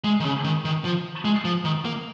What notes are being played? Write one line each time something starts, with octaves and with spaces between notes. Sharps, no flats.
G#3
D#3
C#3
D#3
D#3
F3
G#3
F3
D#3
A#3